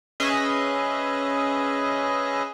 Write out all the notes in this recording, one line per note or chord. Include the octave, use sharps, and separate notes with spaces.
C#4 G#4 B4 D#5 E5